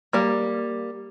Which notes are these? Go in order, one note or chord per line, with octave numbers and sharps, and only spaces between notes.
G3 A#3